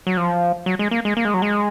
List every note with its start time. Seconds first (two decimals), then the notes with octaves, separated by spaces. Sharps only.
0.07 F#3
0.17 F3
0.66 F#3
0.79 G#3
0.91 A#3
1.05 G#3
1.17 A#3
1.25 G#3
1.34 F#3
1.42 G#3